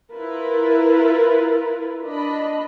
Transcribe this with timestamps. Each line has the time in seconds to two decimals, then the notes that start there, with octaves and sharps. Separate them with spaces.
0.12 E4 F4 A#4 B4
2.04 D4 D#5 B5